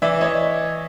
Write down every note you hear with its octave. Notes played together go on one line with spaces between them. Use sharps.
E3 D5 E5
E3 C#5 D#5